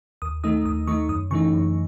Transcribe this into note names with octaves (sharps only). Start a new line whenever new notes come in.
D#2 D#6
D#3 A3 D#4 D#6
D#2 D#6
D#3 A3 D#4 C#6
F#2 D#6
C#3 E3 A3 D#4 C#6
F#2